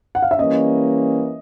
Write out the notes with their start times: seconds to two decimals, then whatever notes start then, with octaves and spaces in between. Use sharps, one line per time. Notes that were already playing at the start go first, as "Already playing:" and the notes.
0.15 F#5
0.22 F5
0.31 E5
0.39 E3 G3 A#3 C#4 D#5